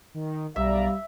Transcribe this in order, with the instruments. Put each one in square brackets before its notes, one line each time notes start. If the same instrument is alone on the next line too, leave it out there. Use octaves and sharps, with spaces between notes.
[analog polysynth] D#3
[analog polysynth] B1 D5 A#5 [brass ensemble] G3 F5 [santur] E5